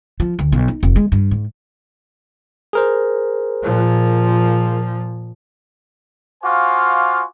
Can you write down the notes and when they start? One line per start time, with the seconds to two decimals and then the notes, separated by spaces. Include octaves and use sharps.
0.20 F3
0.39 D2
0.52 B1
0.68 D#4
0.83 F1
0.96 G#3
1.12 G2
1.31 G#2
2.73 G#4 A#4 C5
3.63 A#2 F3
6.43 F4 F#4 C5 F5 G#5 D6